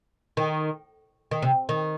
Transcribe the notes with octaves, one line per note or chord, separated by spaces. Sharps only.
D#3
D#3
C3
D#3